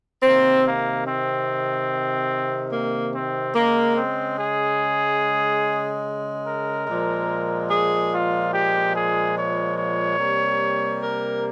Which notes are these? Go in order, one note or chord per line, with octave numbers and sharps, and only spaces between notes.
C3 D#3 A#3 C4
A#3
C4
A#3
C4
C#3 G#3 A#3
C4
G#4
A#4
A#2 F3 G#3
G#4
F4
G4
G#4
C#5
C#5
C3 G3 A#3
A#4